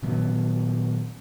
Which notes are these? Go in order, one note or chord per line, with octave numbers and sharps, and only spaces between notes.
A#2 D#3 F#3 B3